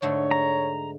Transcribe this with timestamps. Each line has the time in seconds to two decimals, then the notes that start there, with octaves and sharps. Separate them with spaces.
0.02 G#2 D3 A3 C#5
0.31 A#5